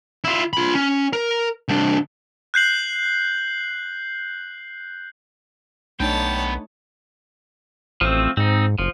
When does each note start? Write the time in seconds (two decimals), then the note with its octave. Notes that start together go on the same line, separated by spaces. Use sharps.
0.24 E4 F4
0.53 F4 B5
0.75 C#4
1.13 A#4
1.68 C2 D4
2.54 F#6 G6 C7 F#7
6.00 B1 A3 B3 D4 D#4 C#5 G5 A5
8.01 A1 F3 A3 C4
8.37 G#2 C4 D#4
8.78 F#1 F3